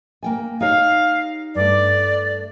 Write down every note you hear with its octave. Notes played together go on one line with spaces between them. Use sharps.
A#3 G5 G#5
D#4 G4 C#5 F5
G2 A3 D5